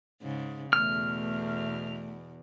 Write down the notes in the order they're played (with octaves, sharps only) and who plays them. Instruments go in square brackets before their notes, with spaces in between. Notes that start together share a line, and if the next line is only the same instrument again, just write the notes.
[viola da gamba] G#2 C#3
[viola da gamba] E2 B2 [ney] A3 [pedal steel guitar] F6